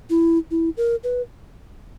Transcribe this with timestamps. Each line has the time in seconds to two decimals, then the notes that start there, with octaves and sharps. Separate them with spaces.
0.10 E4
0.51 E4
0.77 A#4
1.03 B4